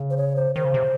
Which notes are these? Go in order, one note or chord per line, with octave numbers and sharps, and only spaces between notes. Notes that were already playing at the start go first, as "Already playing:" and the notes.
Already playing: C#3
C5
C#5
C5
D#3 C5
C#3
C3